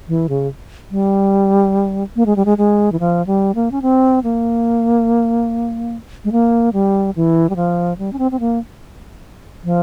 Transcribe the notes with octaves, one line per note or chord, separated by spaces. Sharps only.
E3
C#3
G3
A#3
G#3
G3
G#3
G#3
E3
F3
G3
A#3
C#4
C4
A#3
G#3
A#3
G3
E3
G3
F3
G3
C#4
C4
C4
A#3
F3